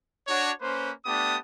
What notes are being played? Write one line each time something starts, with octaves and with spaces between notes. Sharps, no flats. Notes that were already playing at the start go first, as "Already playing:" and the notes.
D4 F#4 C#5
A#3 C#4 B4 C5
A3 B3 D4 G4 A5 D#6